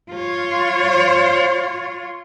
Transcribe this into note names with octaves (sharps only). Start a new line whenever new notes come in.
F4 C#5